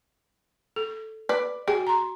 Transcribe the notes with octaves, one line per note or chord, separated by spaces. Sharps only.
A4
B4 D5
F#4 G#4 G5
A#5 C6